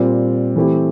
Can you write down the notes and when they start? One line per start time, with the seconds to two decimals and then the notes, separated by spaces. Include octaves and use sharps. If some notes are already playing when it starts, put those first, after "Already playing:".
Already playing: A#2 G3 C4
0.56 E3 A3 C4 E4 G4